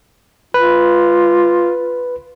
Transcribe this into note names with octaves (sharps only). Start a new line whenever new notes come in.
F4 B4